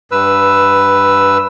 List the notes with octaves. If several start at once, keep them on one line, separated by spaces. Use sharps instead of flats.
G2 B4 E6